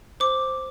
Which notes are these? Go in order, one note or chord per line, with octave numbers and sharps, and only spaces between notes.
C5 D6